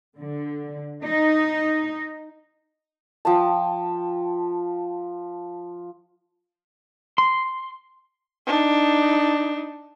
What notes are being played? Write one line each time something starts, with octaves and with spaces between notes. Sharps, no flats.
D3
D#4
F3 G5 A5
C6
D4 D#4